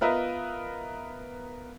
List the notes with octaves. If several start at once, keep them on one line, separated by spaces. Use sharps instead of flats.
B3 F4 A#4 B4 D#5 E5